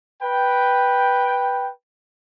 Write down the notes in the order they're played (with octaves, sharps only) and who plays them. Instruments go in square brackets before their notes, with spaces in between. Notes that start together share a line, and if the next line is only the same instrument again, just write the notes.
[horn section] B4 G5